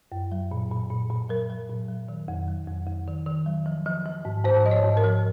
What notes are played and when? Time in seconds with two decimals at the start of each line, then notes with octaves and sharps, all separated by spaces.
0.12 F#2
0.32 F#3
0.51 A#2
0.71 A#2
0.90 A#2
1.10 A#2
1.29 F#3 A#4
1.50 F#3
1.69 A#2
1.88 F#3
2.08 D#3
2.28 F2
2.48 F#3
2.67 F2
2.87 F2
3.07 D#3
3.26 D#3
3.46 F#3
3.66 F3
3.86 F3
4.06 F3
4.25 G#2
4.44 G#2 C5
4.64 F3 D#5
4.71 C#5
4.84 G#2
4.97 A#4
5.03 F3